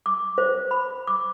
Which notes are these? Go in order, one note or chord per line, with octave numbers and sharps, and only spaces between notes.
D6
C5
B5
D6